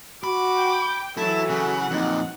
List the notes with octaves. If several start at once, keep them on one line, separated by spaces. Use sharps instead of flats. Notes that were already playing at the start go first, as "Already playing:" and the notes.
F#4 B5 D6
G5
E3 F#3 E4 A4 A5
C#3 F#5
F2 A#2 D#4